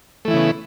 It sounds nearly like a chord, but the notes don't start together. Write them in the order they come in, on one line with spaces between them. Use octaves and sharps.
A3 E3 E4 C#3 B3